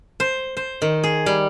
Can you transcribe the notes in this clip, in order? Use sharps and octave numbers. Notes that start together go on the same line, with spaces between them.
C5
C5
D#3
G#4
G3